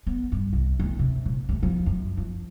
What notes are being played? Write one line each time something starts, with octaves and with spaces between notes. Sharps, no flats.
B3
G2
C2
D2
C3
A#2
D2
F3
F#2
F3